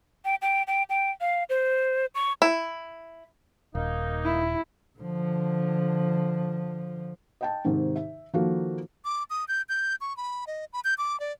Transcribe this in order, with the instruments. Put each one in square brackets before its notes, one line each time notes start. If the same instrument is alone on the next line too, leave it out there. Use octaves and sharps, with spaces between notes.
[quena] G5
G5
G5
G5
F5
C5
C#6
[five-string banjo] E4
[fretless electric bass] D#1 [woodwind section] A#3 D#4
[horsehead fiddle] E4
[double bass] D3 F3
[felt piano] D#5 G5 A5
G#2 C3 D#3
E5
D#3 F3 A#3 F4 F#4 A4
[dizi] D6
D#6
G6
G6
C#6
B5
D#5
B5
G6
D6
D5